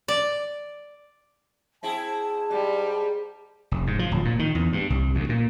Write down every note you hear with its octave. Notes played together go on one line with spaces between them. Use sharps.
D5
C4 E4 G#4 A5
G#2 G3
F1
G#2
F3
D1
A#2
D#3
E2
G2
C2
D2
A#2